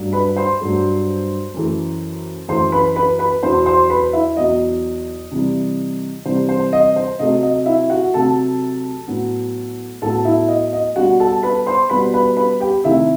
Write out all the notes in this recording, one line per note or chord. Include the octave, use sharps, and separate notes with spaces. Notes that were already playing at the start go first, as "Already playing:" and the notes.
Already playing: G2 F#3 A3
B4 B5
C5 C6
G2 F#3 A3
F#2 E3 A3
F#2 E3 A3 C5 C6
B4 B5
B4 B5
B4 B5
E2 B2 F#3 C5 C6
C5 C6
B4 B5
E4 E5
E2 B2 F#3 D#5
C3 E3 G3
C3 E3 G3 C5
C5
D#5
C5
C3 F#3 A3 D#5
D#5
E4 E5
F#4 F#5
C3 F#3 A3 A4 A5
A2 F#3 B3
A2 F#3 B3 A4 A5
E4 E5
D#5
D#5
B2 G3 B3 F#4 F#5
A4 A5
B4 B5
C5 C6
B2 G3 B3 B4 B5
B4 B5
B4 B5
G4 G5
C3 D#3 A3 E4 E5